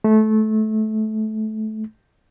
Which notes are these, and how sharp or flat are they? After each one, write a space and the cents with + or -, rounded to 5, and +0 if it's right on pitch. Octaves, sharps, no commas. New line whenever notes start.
A3 -20